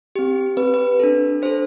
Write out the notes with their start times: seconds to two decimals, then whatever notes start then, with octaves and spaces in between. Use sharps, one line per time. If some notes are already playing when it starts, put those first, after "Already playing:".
0.15 C4 G4
0.57 C4 B4
0.62 G4
0.74 B4
1.00 D4 A4
1.42 D4 A4 C5